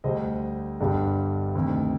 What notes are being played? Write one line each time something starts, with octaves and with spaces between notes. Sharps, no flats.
D2 D3 G3 C5 D#5
G1 G2 D3 G3
D2 C3 D#3